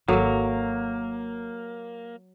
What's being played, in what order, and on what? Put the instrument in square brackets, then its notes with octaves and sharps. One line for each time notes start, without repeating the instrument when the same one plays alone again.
[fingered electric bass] G#1 [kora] F#3 [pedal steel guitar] A#3 [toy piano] A4 A#4